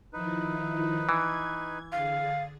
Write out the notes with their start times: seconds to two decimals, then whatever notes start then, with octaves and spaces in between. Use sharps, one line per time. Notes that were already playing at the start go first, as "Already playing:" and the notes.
0.13 D#3 F3 D#4 E4 B4
1.09 E3 G#6
1.92 D3 G#4 F5 A6